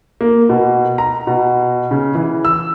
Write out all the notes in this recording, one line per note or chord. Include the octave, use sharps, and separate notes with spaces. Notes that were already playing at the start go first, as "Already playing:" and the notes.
A#3
B2
A#5
B2
C#3
E3
E6